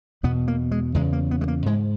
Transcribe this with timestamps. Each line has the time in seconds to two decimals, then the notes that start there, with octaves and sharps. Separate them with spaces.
0.23 E2 B2 B3
0.48 A#3
0.71 G#3
0.94 E2 C#3 G#3
1.13 A#3
1.31 B3
1.41 G#3
1.48 A#3
1.66 G#2 G#3